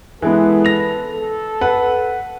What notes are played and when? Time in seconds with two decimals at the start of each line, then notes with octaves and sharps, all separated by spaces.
0.22 E3 G#3 B3 A4 B4
0.65 A#6 F7
1.13 A4
1.61 B4 F#5